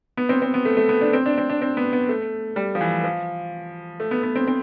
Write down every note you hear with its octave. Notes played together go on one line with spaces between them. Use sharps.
B3
C4
C4
B3
A3
A3
B3
D4
C4
D4
C4
D4
C4
B3
B3
A3
G3
F3
E3
F3
A3
B3
B3
C4
C4